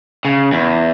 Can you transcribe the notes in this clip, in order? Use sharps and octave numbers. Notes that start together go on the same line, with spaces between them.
C#3
E2